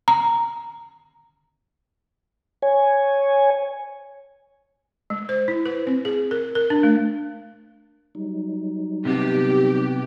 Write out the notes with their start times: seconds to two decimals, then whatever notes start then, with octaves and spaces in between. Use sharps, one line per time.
0.08 A#5
2.62 C#5 G#5
5.10 G#3
5.29 C5
5.48 E4
5.66 B4
5.87 C4
6.05 G#4
6.31 A#4
6.55 A#4
6.70 D4
6.83 A3
8.15 F#3 G3 D#4
9.05 C3 B3 G4